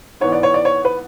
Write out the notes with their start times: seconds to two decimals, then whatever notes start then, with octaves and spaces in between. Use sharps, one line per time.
0.20 G#2 E3 B3 C#5
0.32 D5
0.43 C#5
0.54 D5
0.65 C#5
0.85 B4